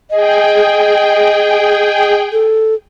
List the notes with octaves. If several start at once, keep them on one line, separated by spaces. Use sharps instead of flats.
G#4 D#5 G5
A4